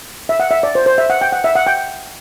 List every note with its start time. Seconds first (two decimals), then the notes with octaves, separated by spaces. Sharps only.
0.29 E5
0.40 F#5
0.51 E5
0.63 D5
0.75 C5
0.86 C5
0.98 E5
1.10 F#5
1.21 G5
1.33 F#5
1.44 E5
1.55 F#5
1.67 G5